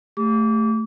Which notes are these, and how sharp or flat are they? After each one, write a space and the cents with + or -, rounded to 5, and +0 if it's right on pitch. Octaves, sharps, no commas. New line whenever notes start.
A3 +0 G4 +35 D6 -30